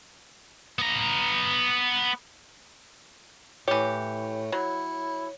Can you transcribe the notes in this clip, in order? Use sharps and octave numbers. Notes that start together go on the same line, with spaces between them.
B3 A#5
A2 E3 G4 C#5
F#3 E4